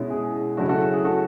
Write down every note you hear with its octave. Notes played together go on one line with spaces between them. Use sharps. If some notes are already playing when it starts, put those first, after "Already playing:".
Already playing: B2 G#3 C#4 E4
G#4
C#3 F#3 A3 C#4 E4 F#4 A4
F#4 A4
G#4
F#4 A4